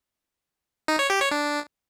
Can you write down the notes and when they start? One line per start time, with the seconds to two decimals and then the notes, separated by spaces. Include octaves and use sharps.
0.88 D#4
0.99 C#5
1.10 G4
1.21 C#5
1.31 D4